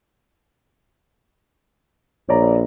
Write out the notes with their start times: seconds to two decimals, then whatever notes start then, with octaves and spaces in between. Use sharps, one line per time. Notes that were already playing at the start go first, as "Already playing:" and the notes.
2.29 A#1 C#5 D5 A#5